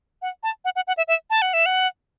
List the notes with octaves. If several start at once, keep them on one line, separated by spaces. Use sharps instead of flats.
F#5
A5
F#5
F#5
F#5
E5
E5
A5
F#5
E5
F#5